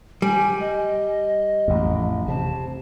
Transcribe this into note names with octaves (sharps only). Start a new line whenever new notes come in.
G3 G#5
D#5
A1 F2
C3 A5